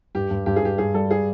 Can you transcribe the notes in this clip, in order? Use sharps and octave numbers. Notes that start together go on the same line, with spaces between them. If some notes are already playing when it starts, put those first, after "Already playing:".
G2 G4
G2
G2 G4
G#4
G2 G4
G2 G#4
G3 A4
G#4